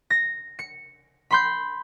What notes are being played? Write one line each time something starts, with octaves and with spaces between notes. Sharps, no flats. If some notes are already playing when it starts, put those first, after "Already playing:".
A#6
C#7
B5 C6 G6